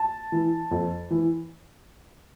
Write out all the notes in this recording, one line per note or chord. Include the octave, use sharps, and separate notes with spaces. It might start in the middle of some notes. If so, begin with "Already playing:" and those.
Already playing: A5
E3
F2
E3